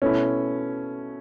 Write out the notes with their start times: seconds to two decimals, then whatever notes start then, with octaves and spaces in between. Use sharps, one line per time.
0.02 B2 A3 C#4 E4